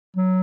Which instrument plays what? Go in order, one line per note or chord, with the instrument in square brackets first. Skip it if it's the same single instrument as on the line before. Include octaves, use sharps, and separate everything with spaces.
[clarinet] F#3